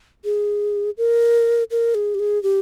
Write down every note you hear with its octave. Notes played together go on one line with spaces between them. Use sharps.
G#4
A#4
A#4
G#4
G4
G#4
G4